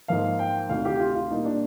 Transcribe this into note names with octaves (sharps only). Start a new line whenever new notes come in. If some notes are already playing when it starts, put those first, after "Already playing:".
G#2 F3 A#3 F5
G5
D2 C3 D#3 F5
G4
F4
F4
A#2 G3 A#3 D#4
D4